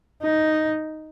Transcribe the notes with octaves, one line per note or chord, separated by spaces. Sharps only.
D#4